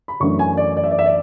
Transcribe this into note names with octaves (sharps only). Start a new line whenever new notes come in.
B5
F#2 E3 A3 D4 C#6
G#5
D5
D5
E5
D5
E5
D5